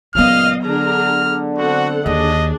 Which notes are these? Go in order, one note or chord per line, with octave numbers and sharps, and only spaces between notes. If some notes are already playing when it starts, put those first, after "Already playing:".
C#2 A#2 F#3 B3 D#5 F5 F6
D3 D4 G#4 A#5 F6
C4 F#4 A4 F#5
D#2 D#3 D4 G#4 D#5